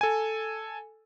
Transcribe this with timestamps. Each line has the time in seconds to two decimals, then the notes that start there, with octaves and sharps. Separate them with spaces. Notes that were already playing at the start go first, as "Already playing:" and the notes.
0.01 A4 G#5